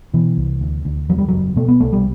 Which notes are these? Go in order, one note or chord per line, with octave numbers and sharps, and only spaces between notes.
B2 E3
C2
D2
D2
E2 F#3
G3
F#1 F#3
B2 A3
B3
C2 A3
G3